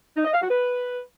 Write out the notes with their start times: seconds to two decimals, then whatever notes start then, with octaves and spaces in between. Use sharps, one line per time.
0.17 D#4
0.25 D#5
0.33 F5
0.41 F#4
0.49 B4